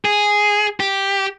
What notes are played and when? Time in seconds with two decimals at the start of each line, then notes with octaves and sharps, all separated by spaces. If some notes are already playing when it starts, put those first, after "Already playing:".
0.05 G#4
0.80 G4